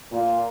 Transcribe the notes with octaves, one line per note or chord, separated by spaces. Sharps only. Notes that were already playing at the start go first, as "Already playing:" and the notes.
A#2